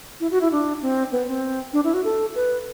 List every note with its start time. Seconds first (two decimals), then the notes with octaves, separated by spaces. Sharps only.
0.20 E4
0.31 F#4
0.41 E4
0.52 D4
0.82 C4
1.12 B3
1.28 C4
1.73 D4
1.84 E4
1.94 F#4
2.04 A4
2.35 B4